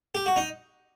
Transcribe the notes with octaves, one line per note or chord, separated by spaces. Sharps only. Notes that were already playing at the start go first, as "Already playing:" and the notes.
G4
F#4
D#4